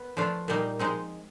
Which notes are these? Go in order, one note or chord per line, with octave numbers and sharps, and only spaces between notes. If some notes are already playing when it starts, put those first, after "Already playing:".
Already playing: B3
F3 A3 D4 F4
A#2 G3 A#3 D#4
F3 G#3 C4 D#4